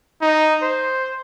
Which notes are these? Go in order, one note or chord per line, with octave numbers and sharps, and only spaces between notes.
D#4
C5